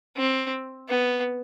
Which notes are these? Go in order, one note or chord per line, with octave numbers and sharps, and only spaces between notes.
C4
B3